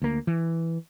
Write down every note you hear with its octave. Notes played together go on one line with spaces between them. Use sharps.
D2 A#3
E3